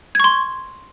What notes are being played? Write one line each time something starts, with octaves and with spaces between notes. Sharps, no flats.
C6 C#6 G#6